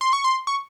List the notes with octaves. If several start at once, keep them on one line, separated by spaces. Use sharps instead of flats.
C6
C#6
C6
C#6